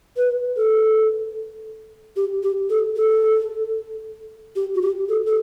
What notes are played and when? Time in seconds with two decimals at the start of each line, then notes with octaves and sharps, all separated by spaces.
0.17 B4
0.57 A4
2.16 G4
2.43 G4
2.70 A4
2.96 A4
4.56 G4
4.75 F#4
4.82 G4
5.09 A4
5.26 A4